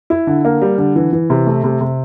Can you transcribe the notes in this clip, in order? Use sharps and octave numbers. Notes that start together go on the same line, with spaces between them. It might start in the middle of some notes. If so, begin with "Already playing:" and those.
E4
D3
A#3
G3
D3
E3
E3
C3
A3
C3
C3